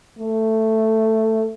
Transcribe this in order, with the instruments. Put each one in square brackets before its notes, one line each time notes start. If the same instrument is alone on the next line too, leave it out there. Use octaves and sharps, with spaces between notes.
[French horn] A3